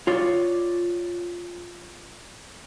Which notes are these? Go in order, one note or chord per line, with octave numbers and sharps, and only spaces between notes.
F4 C#5 D5